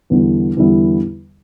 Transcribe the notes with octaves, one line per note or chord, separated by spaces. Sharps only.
E2 D3 G3 B3 E4
E2 D3 G3 B3 E4